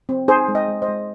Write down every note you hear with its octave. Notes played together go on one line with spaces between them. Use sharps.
C4
D#4 G#4 C5
G#3
D#5 G5
G#3
C5 D#5
G#3